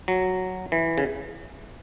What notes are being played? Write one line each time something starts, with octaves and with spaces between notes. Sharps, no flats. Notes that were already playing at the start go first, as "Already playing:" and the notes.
F#3
E3
C#3